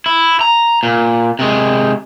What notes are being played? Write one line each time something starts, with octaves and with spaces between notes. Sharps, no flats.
E4
A#5
A#2
C3 G#3